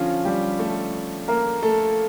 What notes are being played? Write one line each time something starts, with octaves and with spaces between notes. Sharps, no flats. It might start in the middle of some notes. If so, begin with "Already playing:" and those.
Already playing: D3 F3 C#4 F4
G3 G4
A3 A4
A#3 A#4
A3 A4